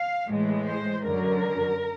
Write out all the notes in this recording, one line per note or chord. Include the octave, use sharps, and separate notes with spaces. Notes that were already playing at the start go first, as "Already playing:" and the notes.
Already playing: F5
A2 E3 G#3
C5
F#2 D3 F#3 A#4